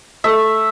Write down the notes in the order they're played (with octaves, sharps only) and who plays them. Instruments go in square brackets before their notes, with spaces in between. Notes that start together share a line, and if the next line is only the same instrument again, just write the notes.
[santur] A3 E5